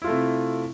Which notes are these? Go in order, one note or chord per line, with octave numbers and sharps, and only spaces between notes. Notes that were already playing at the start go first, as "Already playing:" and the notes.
C3 A3 E4 F4